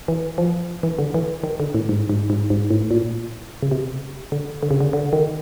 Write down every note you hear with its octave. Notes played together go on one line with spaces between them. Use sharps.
E3
F3
E3
D3
E3
D#3
D3
A2
G#2
G#2
G#2
G#2
A2
A#2
C#3
C3
D3
D3
C#3
D3
D3
D#3